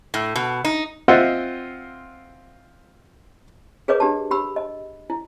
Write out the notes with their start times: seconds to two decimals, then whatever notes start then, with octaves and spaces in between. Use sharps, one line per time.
0.14 A2
0.36 B2
0.65 D#4
1.08 C4 F4 C5 D#5 E5 F#5
3.88 G#4 A#4 B4 C#5 D#5 D6
4.00 D4 G4 A5
4.31 G4 B5 E6
4.56 D#5
5.10 E4